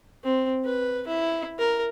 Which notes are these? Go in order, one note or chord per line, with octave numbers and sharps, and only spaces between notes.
C4
B4
E4
A#4